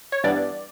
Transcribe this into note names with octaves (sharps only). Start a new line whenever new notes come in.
C#5
G2 E3 G3 B3 D4 D5